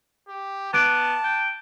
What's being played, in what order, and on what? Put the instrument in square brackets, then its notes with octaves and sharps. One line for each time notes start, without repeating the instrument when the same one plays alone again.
[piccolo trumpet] G4
[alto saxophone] B3 [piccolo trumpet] A5 [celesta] D6 F#6 D7
[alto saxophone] G5